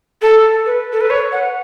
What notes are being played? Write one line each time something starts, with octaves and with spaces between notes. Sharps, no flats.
A4
B4
A4
B4
C#5
F#5